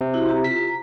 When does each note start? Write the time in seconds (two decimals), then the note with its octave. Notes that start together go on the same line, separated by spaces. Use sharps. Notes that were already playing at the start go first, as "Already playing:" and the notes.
0.01 C3
0.14 C4 E4 F#4
0.29 G4 A#5
0.44 F4 B6
0.68 A#5